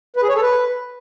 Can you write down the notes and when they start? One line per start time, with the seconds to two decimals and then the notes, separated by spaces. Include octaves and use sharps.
0.16 B4
0.23 G#4
0.29 C#5
0.36 A4
0.42 B4